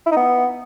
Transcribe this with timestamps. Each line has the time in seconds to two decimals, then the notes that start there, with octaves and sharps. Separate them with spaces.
0.07 E4
0.12 D#4
0.17 B3